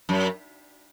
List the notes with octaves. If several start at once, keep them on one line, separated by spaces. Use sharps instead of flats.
F#2